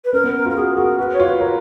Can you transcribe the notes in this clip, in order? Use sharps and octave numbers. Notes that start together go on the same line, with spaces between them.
B4
C#4 A#4
B3
F4 A#4
F#4 G#4
F#4 A#4
F#4 B4
C#5
F4
B4
A#4